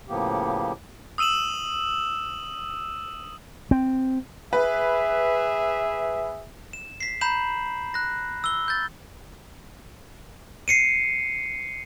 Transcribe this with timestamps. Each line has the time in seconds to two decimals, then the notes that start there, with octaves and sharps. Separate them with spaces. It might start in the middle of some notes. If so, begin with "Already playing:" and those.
0.09 A2 C#3 F3 A#3 B3 G4
1.18 D#6 E6 D#7 E7 F#7
3.71 C4
4.53 G#4 B4 E5
6.73 E7
7.00 B6 C7
7.21 A#5 B5 G6 E7 F#7
7.94 F#6 A#6
8.44 E6 G7
8.68 G6 A6
10.68 C7 C#7 D#7